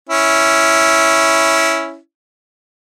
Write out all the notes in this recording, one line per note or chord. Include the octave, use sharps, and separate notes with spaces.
C#4 E4